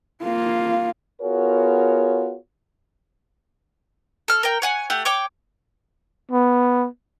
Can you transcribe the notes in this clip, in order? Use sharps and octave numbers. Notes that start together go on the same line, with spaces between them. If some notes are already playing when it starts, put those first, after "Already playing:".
A#3 F4
B3 F4 F#4 G#4 A#4 C#5
A4 F6
A#4 G5
C#5 F#5 G#5
A3 G4 F#5
C#5 G5 D6
B3